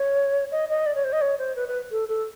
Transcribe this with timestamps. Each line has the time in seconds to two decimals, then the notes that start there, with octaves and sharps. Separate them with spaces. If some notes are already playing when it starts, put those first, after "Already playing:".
Already playing: C#5
0.52 D#5
0.69 D#5
0.86 D5
0.95 C#5
1.04 C5
1.12 D#5
1.21 C#5
1.38 C5
1.56 B4
1.68 B4
1.91 A4
2.08 A4